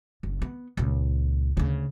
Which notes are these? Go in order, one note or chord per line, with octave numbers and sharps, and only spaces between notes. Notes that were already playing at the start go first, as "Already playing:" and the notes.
F#1
B3
C#2 A#2
D2 C#3